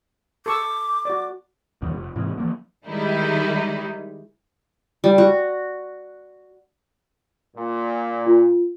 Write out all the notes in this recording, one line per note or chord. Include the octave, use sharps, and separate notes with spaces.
A4 C#6 D6 E6
F#4 D5
B1 E2 B2 D#3
F1
G#2 C3 E3
E3 F3 A#3
D#3 G3 G#3 D#4 E4
G3
F#4
A#2
F4